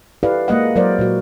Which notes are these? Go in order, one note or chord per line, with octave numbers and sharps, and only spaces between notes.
E4 G4 A4 B4 D5 F5
G#3 A#3 D#5 F#5
F#3 G#3 E4 A#4 C5 D5
A#2 F#3 F#4